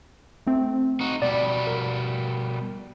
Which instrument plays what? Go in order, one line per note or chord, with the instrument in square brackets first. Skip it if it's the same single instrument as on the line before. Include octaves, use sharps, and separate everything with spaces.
[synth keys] A3 C4
[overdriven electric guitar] D#4 F#4
[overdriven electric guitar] B2 G3 [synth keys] D5
[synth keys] A#4